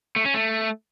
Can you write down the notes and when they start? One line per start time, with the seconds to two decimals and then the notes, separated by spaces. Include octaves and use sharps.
0.16 A3
0.25 C#4
0.34 A3